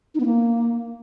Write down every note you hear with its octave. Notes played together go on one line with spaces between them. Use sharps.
D#4
B3
A#3